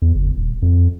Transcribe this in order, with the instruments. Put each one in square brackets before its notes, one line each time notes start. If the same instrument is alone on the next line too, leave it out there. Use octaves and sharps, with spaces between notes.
[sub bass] E2
F#1
D#1
F2